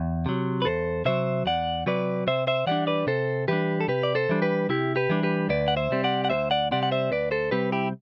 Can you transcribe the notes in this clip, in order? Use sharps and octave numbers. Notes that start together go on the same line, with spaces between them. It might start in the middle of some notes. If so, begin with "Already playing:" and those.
Already playing: E2
C3 F#3
B4
E2 A4 C5
C3 F#3 C5 E5
E2 D5 F#5
C3 F#3 B4 D5
C3 C5 E5
C5 E5
E3 G3 D4 D5 F#5
B4 D5
C3 A4 C5
E3 G3 D4 G4 B4
A4
C3 G4 B4
D5
A4 C5
E3 G3 D4
G4 B4
C3 E4 G4
G4 B4
E3 G3 D4
G4 B4
D2 B4 D5
F#5
C5 E5
C3 G3 C4
D5 F#5
F#5
D2 C5 E5
D5 F#5
C3 G3 C4 D5 F#5
F#5
C5 E5
D2 B4 D5
A4 C5
C3 G3 C4 G4 B4
E4 G4